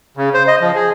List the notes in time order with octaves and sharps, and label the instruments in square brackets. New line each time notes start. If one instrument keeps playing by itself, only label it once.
[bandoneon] C#3
C5
D#5
F3
G#4